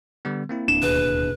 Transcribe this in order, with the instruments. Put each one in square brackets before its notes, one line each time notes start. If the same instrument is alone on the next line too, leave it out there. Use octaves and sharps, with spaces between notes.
[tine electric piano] D3 G3 B3
A#3 C4 E4
[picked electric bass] D1 D4 [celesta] E7
[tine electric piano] D#2 B2 G#4 [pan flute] B4